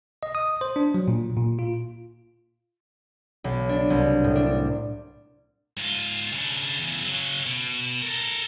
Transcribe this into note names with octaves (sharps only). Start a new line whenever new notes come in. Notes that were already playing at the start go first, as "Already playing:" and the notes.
D#5
D#6
C5
D4
F#3
A#2
A#2
F4
B1
D4
C2
A2
D4
G#2 F4
C#3 D4
E2 C#3
C#3 F#3
B2
A4 A#4